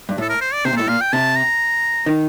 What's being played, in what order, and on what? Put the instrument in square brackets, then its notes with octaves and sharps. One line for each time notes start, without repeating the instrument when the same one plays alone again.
[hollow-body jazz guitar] G2
[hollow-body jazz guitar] A2 [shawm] A4
[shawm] A#4
C5
D5
[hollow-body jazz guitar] C3 [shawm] C5
[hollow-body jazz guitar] A#2
[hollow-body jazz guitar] A2 [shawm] A4
[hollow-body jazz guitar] A#2 [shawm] F5
[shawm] G5
[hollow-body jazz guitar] C3 [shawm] A5
[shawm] A#5
[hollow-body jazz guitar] D#3